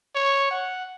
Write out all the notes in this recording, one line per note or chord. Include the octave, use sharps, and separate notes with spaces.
C#5
F#5